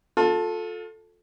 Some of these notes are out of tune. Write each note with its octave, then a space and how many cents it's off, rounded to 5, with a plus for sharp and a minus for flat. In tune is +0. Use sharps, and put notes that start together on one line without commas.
F4 +35 A4 +0